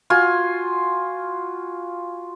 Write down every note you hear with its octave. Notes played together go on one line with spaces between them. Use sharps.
F4 F#4 G#5